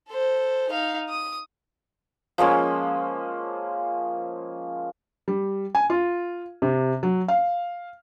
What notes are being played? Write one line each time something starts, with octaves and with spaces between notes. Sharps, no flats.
A4 C5
D#4 F5
D#6
F3 G#3 A#3 C#4
G3
G#5
F4
C3
F#3
F5